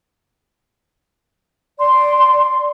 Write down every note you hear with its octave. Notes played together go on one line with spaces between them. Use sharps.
D5 C6